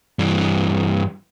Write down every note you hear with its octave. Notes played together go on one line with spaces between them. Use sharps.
G2 E3